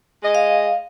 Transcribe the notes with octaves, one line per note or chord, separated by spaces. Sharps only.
G#3 D#5
F5